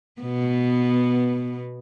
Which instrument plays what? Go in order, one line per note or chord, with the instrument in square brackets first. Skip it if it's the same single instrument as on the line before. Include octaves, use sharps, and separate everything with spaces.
[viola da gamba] B2 B3